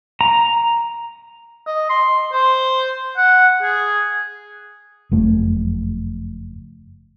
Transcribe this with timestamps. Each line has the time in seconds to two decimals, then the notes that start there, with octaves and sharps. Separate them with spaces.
0.21 A#5
1.67 D#5
1.90 C6
2.32 C5
3.17 F#5
3.63 G#4
5.11 F#1 F2 A3